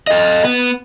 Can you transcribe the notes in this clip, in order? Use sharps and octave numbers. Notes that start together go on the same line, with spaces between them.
A4 D#5
B3